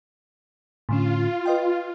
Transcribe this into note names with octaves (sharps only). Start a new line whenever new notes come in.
A2 D3 C#4 F4
B4 D#5 G5